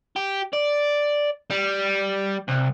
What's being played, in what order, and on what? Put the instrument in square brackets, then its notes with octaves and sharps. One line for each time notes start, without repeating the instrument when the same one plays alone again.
[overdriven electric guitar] G4
D5
G3
C2